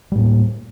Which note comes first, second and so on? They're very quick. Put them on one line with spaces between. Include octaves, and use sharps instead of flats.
G3 A2 A#3